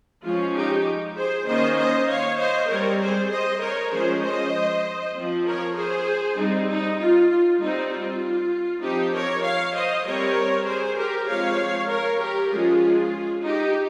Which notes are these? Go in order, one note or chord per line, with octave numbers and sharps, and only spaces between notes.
F3 G#3 C#4 F4
D#4 G4
G#4 C5
D#3 A#3 C#4 C5 D#5
C5 D#5
C#5 F5
C5 D#5
G3 C4 A#4 C#5
G#4 C5
C5 D#5
A#4 C#5
F3 G#3 C#4 G#4 C5
C5 D#5
F3 C4
A#4 C#5
G#4 C5
G3 C4 D#4
D#4
F4
F4
G3 C4 D#4
F4
F3 C4 D#4 G4
A#4 C#5
C#5 F5
C5 D#5
G3 C4 A#4 C#5
G#4 C5
G4 A#4
F3 G#3 C4 C#5 F5
A#4 C#5
G4 A#4
F3 G#3 C#4 F4 G#4
D#4 G4